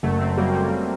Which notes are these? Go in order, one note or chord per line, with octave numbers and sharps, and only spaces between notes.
F#1 F#3 A3
A3 C4
F#3 G3 A#3
G3 A#3